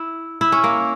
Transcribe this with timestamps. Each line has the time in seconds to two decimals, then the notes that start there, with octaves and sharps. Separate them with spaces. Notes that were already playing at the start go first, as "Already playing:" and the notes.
Already playing: E4
0.41 E4
0.52 C#4
0.64 A#3